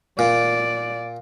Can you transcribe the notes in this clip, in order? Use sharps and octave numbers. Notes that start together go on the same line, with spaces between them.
A#2 D5